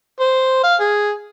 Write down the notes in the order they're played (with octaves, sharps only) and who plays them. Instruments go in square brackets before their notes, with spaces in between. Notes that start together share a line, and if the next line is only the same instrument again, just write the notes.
[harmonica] C5
F5
G#4